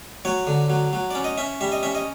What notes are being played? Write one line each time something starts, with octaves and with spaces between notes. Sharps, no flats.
F#3 C#5
D3
F#3
F#3
C#4 D5
D#5
C#4 E5
G3 E5
D#5
C#4 E5
D#5